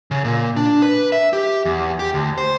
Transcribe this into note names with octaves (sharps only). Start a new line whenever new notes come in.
C#3
A#2
D4
B4
E5
G4
E2
G4
D2
C5